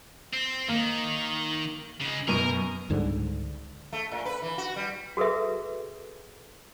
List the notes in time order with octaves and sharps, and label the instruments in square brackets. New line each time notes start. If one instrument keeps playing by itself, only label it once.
[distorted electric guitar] C4
[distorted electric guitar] D#3 [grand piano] A#3
[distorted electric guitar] C#3 G#3
[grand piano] F#2 B2 D#7 [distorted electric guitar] A#4
[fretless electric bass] C#2 G#2 D3 G3
[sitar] A3
A#2
B4
E3
F#4
G3
[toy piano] F#4 G#4 A4 B4 E5